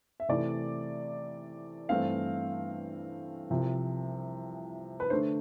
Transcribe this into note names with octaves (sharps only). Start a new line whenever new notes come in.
E5
C3 E3 A3 E4 D5
G2 E3 A3 C4 F5
C2 C3 F3
B4
D3 A3 D4 C5